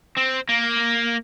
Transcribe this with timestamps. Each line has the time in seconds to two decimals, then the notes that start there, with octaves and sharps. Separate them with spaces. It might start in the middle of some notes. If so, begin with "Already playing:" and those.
0.17 C4
0.49 A#3